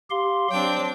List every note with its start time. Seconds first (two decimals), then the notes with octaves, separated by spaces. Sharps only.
0.10 G4 F5 C6
0.50 F#3 C4 D4 G5